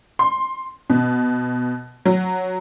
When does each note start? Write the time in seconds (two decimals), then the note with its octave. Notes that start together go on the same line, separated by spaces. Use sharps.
0.19 C6
0.90 B2
2.05 F#3